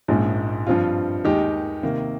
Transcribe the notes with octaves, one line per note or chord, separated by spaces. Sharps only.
A#1 G#2 F3 G#3 C#4
G2 F3 C4 F4
D#2 D#3 G#3 D#4 G4
C3 D#3 A#3